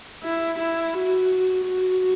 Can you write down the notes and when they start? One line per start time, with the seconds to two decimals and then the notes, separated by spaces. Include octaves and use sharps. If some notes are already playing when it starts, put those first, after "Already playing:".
0.24 E4
0.59 E4
0.94 F#4
1.64 F#4